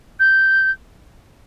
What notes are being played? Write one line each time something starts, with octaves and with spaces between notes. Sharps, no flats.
G6